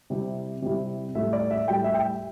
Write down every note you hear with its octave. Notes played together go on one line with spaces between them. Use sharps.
C3 G3 E4
C3 G3 E4
A2 G3 E4 E5
D5
E5
A2 G3 E4 G5
E5
G5